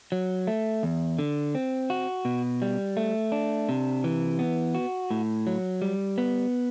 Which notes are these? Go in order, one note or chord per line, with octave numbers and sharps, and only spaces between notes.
F#3
A3
E2
D3
C4
F#4
B2
G3
A3
D4
C3
E3
B3
F#4
A2
F#3
G3
B3